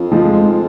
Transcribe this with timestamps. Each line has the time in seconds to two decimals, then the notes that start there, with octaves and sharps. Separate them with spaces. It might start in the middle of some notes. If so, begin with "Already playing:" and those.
Already playing: F2
0.12 F3 G#3